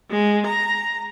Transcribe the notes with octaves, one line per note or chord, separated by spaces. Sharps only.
G#3
A#5